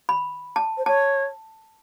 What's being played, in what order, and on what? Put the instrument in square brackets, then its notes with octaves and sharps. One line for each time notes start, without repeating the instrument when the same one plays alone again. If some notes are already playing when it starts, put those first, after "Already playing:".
[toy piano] B5
A5
[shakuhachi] C5
[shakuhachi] C#5 [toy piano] A5